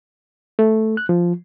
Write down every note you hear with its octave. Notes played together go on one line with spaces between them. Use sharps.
A3
F#6
F3